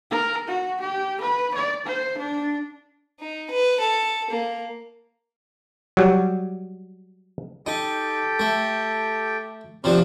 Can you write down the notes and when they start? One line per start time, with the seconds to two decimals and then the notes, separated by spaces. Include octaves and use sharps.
0.11 A#4
0.48 F#4
0.81 G4
1.21 B4
1.54 D5
1.86 C5
2.18 D4
3.20 D#4
3.50 B4
3.80 A4
4.30 A#3
5.97 F#3 G3
7.66 D#4 G4 A4 G5
8.39 A3
9.84 C3 F3 C4 D4 A#5 F6